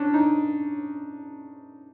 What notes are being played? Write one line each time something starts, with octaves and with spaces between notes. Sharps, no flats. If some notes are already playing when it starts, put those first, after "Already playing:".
Already playing: C#4 D4
D#4